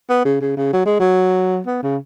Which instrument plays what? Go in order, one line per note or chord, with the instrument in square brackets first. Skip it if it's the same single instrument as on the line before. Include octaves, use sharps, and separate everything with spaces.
[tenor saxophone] B3
C#3
C#3
C#3
F#3
G#3
F#3
B3
C#3